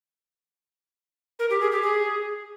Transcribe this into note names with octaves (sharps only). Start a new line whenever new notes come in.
A#4
G4
G#4
G4
G#4